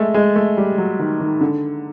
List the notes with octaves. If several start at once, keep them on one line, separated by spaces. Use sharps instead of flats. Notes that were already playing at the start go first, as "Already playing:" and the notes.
Already playing: G#3 A3
G#3
A3
G3
F#3
D#3
D#3
D3